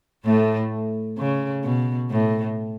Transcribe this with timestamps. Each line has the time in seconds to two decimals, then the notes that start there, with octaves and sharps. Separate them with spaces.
0.25 A2 A3
1.18 C#3
1.64 B2
2.10 A2